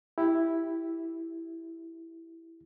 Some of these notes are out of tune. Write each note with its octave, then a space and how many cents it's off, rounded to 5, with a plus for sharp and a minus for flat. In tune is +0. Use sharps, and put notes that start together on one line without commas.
E4 +0 G4 +0